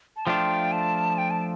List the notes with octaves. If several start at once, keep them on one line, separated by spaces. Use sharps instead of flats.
A5
F3 A3 D4 F4 G5
A5
G5
A5